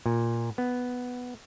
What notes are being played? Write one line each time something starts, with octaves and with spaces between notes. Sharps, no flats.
A#2
B3